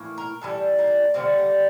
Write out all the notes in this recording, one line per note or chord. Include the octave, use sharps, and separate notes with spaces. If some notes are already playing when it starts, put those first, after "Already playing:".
Already playing: A2 E3 A#3
A#4
A2 E3 G3 A4
A#3
D3 G3 A#3 C4
A#3